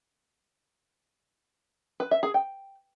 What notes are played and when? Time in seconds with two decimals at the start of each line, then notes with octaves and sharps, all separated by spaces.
2.00 B4
2.11 E5
2.23 G#4
2.34 G5